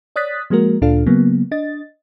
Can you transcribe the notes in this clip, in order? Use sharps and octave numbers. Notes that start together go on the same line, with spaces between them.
C#5 D5 D#6 F#6 A6 B6
F3 G#3 A#3 F#4 A#4
D2 A#2 D4 F4 A4 F5
C#3 F#3 A#3 B3
D4 D#5 A6